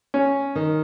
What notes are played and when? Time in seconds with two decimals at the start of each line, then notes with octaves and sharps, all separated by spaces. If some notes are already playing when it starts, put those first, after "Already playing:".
0.14 C#4
0.55 D#3